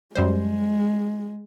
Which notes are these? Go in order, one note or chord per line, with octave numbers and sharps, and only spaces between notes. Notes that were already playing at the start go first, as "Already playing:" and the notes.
F#2 G3 G#3 C5